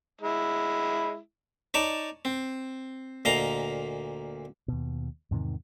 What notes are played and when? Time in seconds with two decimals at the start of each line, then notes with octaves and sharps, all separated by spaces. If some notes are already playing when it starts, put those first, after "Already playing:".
0.21 G#3 E4
1.74 D#4 C#5 D5 A5
2.25 C4
3.25 D2 A#2 D#5 F5 A#5
4.68 D#2 B2
5.31 E2 G#2 C3 D#3